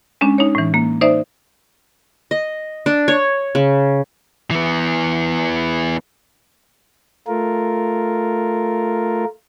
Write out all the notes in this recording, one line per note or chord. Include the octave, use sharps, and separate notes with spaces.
G#3 C#4 D4
D#4 C#5
A2 E3
A#3
D#4 C5 D5 E5
D#5
D4
C#5
C#3
E3 B3
A3 F4 A#4